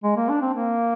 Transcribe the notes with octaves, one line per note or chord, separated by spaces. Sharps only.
G#3
A#3
D4
C4
A#3